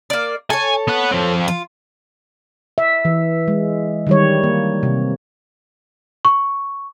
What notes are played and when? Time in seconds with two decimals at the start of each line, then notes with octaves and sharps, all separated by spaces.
0.10 A#3 D5
0.50 A4 C#5 G#5
0.88 B3 F#5
1.11 F3 C4
1.48 F4
2.78 E5
3.05 E3
3.48 G#3
4.07 D#3 G3 C#5
4.43 A#3
4.83 C3
6.25 C#6